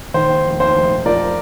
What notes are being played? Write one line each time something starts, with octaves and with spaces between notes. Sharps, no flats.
D#3 C5
D#2
F1
D#2 C5
F1
F1
F3 A#4 D5